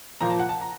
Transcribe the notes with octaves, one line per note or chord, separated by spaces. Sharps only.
A#2 F3 A#3 A#5
A5
F#5
A5
A#5